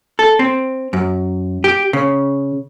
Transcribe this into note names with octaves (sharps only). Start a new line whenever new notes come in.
A4
C4
F#2
G4
C#3